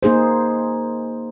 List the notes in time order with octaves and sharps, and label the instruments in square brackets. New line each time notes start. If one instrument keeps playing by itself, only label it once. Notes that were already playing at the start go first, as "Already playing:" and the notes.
[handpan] A#3 D#4 G#4 C5